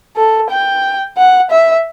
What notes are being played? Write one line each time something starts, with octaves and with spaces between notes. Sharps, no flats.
A4
G5
F#5
E5